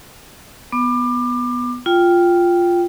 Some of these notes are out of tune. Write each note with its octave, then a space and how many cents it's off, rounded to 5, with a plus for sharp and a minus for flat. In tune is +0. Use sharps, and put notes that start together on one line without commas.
B3 +0 D6 +25
F4 +0 G5 +0